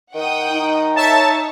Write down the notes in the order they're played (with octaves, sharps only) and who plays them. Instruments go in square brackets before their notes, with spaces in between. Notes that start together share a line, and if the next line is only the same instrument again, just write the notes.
[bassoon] D#3 [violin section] F#5 G5 D#6
[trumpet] D#4
[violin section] C#5 [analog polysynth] E5 A5